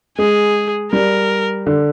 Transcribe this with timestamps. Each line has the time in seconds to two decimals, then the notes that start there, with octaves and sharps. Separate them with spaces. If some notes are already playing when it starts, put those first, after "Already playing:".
0.18 G#3 G#4
0.93 G3 A#4
1.67 D3